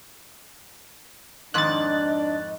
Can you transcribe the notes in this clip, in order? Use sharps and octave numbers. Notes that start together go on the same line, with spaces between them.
F2 G#2 D#3 D4 D#5 F#6 A6